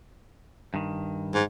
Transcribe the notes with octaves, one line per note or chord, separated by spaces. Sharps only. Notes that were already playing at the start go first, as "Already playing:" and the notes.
G2 D#3
G#2